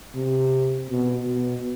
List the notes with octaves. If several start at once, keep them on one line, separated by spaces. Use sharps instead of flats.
C3
B2
B2